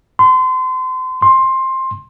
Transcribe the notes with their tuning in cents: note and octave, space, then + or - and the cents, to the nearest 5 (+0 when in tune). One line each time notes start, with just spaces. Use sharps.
C6 -30
C6 +15